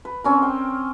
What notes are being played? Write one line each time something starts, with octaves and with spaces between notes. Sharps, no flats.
B4
C4 C#4 A#4
G5